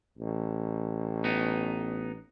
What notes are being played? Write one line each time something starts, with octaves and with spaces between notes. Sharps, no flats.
A1
B3 D#4